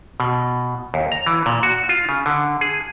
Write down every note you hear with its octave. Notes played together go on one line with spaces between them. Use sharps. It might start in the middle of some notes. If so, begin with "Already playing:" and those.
B2
D#2
A#5
E3
A#2
F#4
F4
C#3
D3
G#4